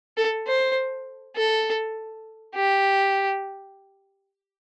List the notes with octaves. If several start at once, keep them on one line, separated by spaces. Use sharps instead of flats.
A4
C5
A4
G4